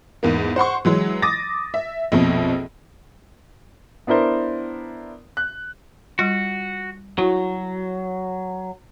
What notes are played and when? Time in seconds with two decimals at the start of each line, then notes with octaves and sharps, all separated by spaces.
0.23 E2 G#2 A#3
0.56 C5 F#5 C6 C#6
0.85 E3 F#3 G#3
1.22 D6 D#6 A6 A#6
1.74 E5
2.12 A#1 F2 B2
4.07 B3 D4 E4 A#4 C5
5.37 F#6
6.19 G3 F4 F#4
7.18 F#3 E4 F#4